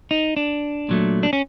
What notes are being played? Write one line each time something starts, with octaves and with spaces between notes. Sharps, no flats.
D#4
D4
A#2 F#3 A3
D4
C#4